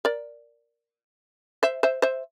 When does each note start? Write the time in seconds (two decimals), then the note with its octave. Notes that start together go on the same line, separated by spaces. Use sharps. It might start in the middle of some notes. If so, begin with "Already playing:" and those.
0.05 A#4 D5
1.63 C5 E5
1.83 C5 E5
2.02 C5 E5